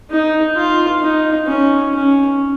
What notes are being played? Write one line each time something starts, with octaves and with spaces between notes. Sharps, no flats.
D#4
F4
D#4
C#4
C#4